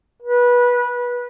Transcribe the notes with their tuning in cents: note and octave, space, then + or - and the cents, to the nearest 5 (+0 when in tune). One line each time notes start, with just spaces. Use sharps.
B4 -20